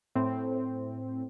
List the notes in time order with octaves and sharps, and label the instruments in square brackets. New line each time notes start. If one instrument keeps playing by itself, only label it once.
[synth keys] A2 C4